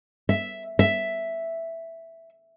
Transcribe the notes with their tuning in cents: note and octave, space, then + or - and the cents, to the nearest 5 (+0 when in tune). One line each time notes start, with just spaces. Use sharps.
E5 +0
E5 +0